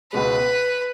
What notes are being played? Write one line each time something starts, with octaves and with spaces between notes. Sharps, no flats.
C#2 B2 G#3 B4